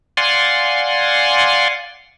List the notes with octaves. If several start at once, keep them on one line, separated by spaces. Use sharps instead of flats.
D5 F5 F#5 G#5 C6